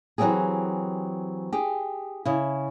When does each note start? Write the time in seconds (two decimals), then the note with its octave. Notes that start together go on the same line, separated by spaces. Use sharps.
0.18 E3 F#3 B3 C4 G4 G#4
1.53 G4 G#4
2.25 C#3 E4